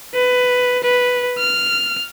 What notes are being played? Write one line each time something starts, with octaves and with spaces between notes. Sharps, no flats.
B4
B4
F6